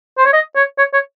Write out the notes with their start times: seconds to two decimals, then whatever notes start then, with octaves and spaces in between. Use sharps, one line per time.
0.18 C5
0.25 C#5
0.33 D#5
0.56 C#5
0.78 C#5
0.94 C#5